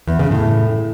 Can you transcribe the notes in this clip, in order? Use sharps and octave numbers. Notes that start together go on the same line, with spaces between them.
E2
C#3
A2